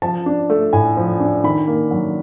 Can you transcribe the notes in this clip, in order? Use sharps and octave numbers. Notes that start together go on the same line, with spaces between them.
F3 A5
D4
A3
A2 G#5
F3
D4
D#3 B5
A#3
F#3